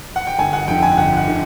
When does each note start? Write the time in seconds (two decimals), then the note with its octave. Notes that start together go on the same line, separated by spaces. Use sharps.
0.16 F#5
0.27 G5
0.38 G1 G#5
0.53 F#5
0.68 F2 D3 G5
0.83 G#5
0.97 G1 F#5
1.17 F#5
1.28 D3